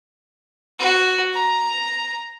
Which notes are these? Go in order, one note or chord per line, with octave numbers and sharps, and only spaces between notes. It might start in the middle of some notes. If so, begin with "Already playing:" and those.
F#4
A#5